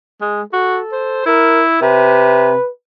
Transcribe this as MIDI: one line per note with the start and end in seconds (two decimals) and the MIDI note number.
0.21 0.42 56
0.53 0.79 66
0.53 1.22 69
0.92 1.24 72
1.26 1.79 64
1.26 1.62 70
1.82 2.54 48
1.82 2.69 71